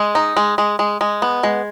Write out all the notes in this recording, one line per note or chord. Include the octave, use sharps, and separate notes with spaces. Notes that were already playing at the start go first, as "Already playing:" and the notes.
Already playing: G#3
D#4
G#3
G#3
G#3
G#3
B3
G#3